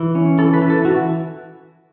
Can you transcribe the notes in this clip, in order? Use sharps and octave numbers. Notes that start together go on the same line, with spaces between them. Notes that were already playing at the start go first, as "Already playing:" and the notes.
Already playing: E3
C#4
E3 A4
B4
E3
A4
E3 F#4